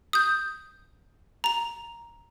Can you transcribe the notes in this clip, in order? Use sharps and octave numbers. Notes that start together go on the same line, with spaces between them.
D#6 G6
A#5 F7